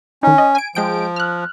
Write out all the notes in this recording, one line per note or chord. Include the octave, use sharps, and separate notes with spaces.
D#3 C#4 D#4
D#5
G#5 D7
F3 G#3 G5 D7
F6 F#6